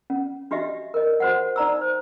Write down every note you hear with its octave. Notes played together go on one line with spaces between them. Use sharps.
C#4
D4 F#4 G4 D#5 E5
A#4 D#5
F#4 C5 F#5
D#4 D5 A#5 E6
C5